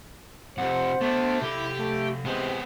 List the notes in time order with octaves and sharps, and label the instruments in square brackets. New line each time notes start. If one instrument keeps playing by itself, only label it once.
[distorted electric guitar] F2 C3 [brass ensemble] C5 [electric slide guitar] F#5
[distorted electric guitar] A3 D4 [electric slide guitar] B3
[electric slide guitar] C3 A4 [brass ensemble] E4 [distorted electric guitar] G4
[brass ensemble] A3
[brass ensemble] C3 E3 G#3 [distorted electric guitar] B3 C5